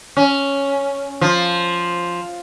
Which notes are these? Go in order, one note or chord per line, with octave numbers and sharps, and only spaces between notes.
C#4
F3